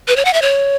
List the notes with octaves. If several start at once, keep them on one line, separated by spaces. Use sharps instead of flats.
B4
C#5
F#5
E5
C#5